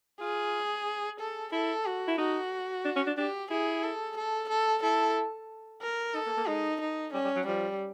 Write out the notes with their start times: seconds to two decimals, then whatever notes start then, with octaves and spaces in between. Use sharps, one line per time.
0.21 F4 G#4
1.20 A4
1.52 E4 A4
1.85 F#4
2.08 E4
2.18 D#4 F#4
2.85 D4
2.96 C#4
3.07 D4
3.17 D4 G4
3.51 E4 G#4
3.83 A4
4.17 A4
4.49 A4
4.83 E4 A4
5.82 A#4
6.14 D#4 A4
6.26 A#3
6.37 A#3
6.48 G#3 D#4
6.81 D#4
7.13 G3 C#4
7.24 G3
7.36 F#3
7.47 F3 G3